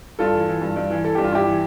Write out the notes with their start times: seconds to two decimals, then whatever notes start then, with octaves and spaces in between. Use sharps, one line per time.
0.19 G2 F4 A4
0.33 E3
0.47 E3
0.62 G2
0.76 G2
0.90 E3
1.04 E3 A4
1.15 G2 G4
1.24 F4
1.32 G2 E4 G4
1.47 E3